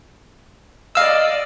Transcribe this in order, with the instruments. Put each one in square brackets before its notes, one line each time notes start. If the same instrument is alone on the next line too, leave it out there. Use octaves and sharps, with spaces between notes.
[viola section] D5 [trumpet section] D#5 [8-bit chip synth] F5 E6